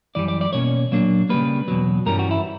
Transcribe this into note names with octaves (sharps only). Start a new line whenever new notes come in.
F#2 E3 G3 D5
D5
D5
B2 A#3 C#4 C#5
A#2 F#3 A#3 D4
C#3 G3 A#3 B4
E2 B2 F#3
G2 E3 G3 C#4 A#4
F#4
E4